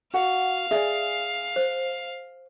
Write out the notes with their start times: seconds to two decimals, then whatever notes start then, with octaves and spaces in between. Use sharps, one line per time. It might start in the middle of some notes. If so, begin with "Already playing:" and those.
0.14 F#4 F5 F#5
0.71 G#4 D5 E5
1.56 C5